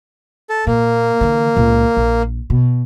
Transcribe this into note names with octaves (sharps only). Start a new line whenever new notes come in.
A4
A#2 A#3
D3 E3
C#2 A#2
A#1
B2